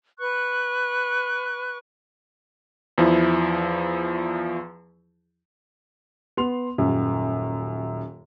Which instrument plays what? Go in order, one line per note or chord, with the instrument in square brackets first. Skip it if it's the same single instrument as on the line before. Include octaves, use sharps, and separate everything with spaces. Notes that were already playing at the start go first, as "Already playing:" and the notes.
[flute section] B4 C#6 F#6
[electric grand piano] E2 F3 E4
[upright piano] B3 C6 F7
D#1 F#2